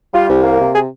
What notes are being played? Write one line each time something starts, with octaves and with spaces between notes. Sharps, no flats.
G3 F4
C2
A#3
C3
G#4